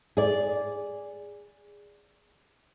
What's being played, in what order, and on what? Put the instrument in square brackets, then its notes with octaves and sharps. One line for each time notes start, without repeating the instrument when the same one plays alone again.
[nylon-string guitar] G#4 D5